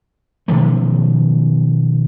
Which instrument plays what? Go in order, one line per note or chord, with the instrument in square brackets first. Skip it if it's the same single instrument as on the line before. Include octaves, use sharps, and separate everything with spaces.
[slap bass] B2 D#3 F3 A3